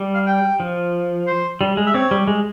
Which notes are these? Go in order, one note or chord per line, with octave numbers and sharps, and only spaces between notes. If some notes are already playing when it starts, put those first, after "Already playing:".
Already playing: G3
F5
G5
F3
C5
G3
G#3
E5
C4 C#5
G3
G#3